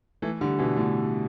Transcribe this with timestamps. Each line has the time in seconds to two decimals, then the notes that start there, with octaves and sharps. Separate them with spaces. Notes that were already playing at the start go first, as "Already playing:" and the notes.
0.22 E3 A3
0.41 D3 G3
0.59 B2 E3
0.77 A2 D3